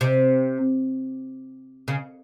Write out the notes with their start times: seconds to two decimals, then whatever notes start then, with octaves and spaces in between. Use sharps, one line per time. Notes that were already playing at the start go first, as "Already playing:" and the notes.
0.01 C3
1.88 C#3